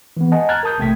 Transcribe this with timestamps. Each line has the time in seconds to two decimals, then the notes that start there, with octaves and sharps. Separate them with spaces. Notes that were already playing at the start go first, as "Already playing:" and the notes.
0.17 E3 B3
0.32 D#5 F#5 G#5 A5
0.49 A#5 F6 F#6 G#6 A6
0.63 A#4 A5 D#6 G6
0.78 A#1 C3 A3 G5 G#6 B6